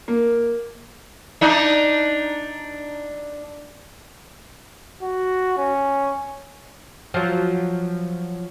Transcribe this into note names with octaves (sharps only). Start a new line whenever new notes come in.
A#3
D4 D#4
F#4
C#4
F3 F#3